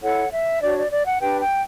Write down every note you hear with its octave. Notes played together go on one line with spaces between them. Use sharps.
E4 A4 C#5 F#5
E5
D4 F#4 C#5 D5
D5
D5
F#5
D4 G4 B4 G5
G5